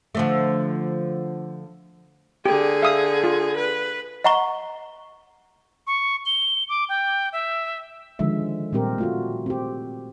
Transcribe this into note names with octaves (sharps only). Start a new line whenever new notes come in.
D3 F3 A3
D3 G4 G#4
E5 F5 D#6
F4
B4
D#5 F#5 A#5 C#6 G7
C#6
G7
D6
G5
E5
D3 D#3 F3 G#3 E5
A#2 G3 C4 G4 A#4
A3 F4 F#4
C4 G4